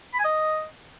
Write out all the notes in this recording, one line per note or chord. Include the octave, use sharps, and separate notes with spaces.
B5
G#5
D#5